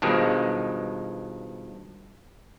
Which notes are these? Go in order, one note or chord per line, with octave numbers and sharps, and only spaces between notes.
G2 B2 D#3 F3 G#3